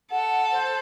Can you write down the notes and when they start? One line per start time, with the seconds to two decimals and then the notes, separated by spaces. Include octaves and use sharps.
0.11 A4 F#5
0.51 C5